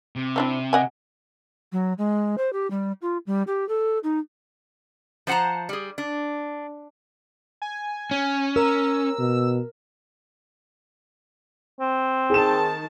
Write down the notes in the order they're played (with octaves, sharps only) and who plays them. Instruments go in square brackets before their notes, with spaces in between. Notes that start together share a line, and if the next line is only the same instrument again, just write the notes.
[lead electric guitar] C3
[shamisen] C4 D4 E4
D#5 F#5 G#5
[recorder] F#3
G#3
C5
G4
G3
F4
G3
G4
A4
D#4
[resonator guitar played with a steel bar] F3 C5 F#5 A5 A#5
G3 G#4
D4
[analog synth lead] G#5
[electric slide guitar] C#4
[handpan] A#4 [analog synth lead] E6
[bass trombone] B2
[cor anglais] C4
[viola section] D#3 A5 [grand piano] G#4 E7